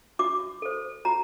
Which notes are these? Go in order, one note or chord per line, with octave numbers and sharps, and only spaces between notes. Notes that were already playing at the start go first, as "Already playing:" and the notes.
F#4 D6
A4 C5
F#4 A#5